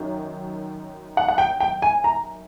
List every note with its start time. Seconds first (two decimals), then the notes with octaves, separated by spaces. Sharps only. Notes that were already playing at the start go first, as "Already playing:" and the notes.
Already playing: F#2 D#3 F#3
1.17 F#5
1.28 F#5
1.38 G5
1.60 G5
1.82 G#5
2.04 A#5